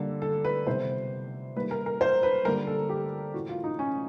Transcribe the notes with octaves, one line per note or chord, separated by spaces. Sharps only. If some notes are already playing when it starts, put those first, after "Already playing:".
Already playing: D3 G3 A#3 A4
A4
B4
C3 D#3 G3 B3 C5
D#3 G3 A#3 B4
A#4
A#4
C5
B4
D3 G3 A#3 A#4
A4
G4
A2 E3 A3 F#4
F4
D#4
C#4